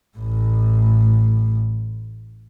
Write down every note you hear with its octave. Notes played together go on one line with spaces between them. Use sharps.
A1 A2